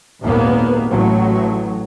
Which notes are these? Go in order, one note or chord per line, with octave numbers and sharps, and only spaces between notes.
G#1 D#2 A#2 A#3 B3
A1 A2 F#3